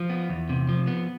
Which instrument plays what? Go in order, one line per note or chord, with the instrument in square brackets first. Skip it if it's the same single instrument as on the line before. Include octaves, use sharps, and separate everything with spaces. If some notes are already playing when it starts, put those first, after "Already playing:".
Already playing: [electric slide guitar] F3
B3
E2
C3
F3
B3